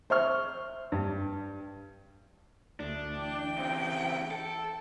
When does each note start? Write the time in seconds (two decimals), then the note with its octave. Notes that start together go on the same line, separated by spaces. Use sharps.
0.10 C5 E5 C#6 F6
0.92 G2
2.80 D2 A3 D4
3.18 E3 G5
3.58 C#3 C4
4.31 A4